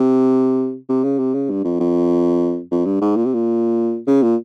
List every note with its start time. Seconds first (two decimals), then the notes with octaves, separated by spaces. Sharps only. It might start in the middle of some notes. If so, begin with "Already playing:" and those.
Already playing: C3
0.89 C3
1.04 C#3
1.19 C3
1.34 C#3
1.50 G2
1.64 F2
1.80 F2
2.71 F2
2.85 G2
3.01 G#2
3.16 A#2
3.25 C3
3.34 A#2
4.07 C#3
4.22 A#2